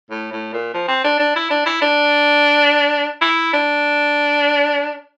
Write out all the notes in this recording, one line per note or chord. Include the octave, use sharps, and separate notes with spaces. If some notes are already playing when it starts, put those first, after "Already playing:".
A2
A2
A#2
F3
C4
D4
D4
E4
D4
E4
D4
E4
D4